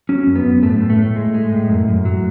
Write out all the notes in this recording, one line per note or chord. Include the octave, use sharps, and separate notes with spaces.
F#3 C#4
F#2
B3
F#2
A2 A3
A2
A3
A2
G#3
G#3
A2
F#2
F#2
F#3